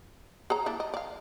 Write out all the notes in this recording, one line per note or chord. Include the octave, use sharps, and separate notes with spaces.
G#4 C#5 A#5
A#3 D4 E4
D#5
D5 F5